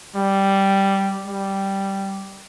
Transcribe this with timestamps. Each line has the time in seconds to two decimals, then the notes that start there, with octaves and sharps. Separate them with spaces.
0.16 G3
1.26 G3